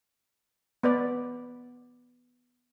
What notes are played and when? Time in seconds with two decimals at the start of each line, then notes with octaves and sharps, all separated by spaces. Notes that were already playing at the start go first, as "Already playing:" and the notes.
0.83 B3 B4 D5